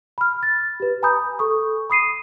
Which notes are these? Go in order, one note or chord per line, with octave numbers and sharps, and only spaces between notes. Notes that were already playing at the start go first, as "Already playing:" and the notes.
B5 F6
A6
G4 B4
G#5 A#5 B5 D#6 G6
A4 C#6 D#6
B5 D#6 C7 D#7